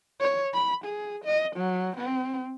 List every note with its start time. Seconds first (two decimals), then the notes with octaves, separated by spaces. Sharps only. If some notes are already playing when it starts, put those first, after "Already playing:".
0.20 C#5
0.54 B5
0.85 G#4
1.25 D#5
1.56 F#3
1.97 C4